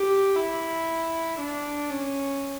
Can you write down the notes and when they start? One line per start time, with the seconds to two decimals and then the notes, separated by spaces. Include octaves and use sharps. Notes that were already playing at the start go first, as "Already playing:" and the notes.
Already playing: G4
0.36 E4
1.40 D4
1.90 C#4